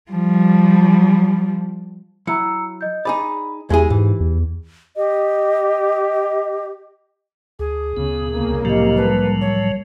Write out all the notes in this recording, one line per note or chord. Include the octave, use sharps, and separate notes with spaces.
F3 G3
F#3 E4 A#5 E6 C#7
D#5 G6
D#4 G#4 D5 B5
E2 G#3 E4 G4 G#4
G#2 E3
E2
G4 D#5
D2 G#4
D2 C#3 B3
C2 C#3 A#3
A2 F3 F#3 G4 D#5
G3 B4 A5
C#5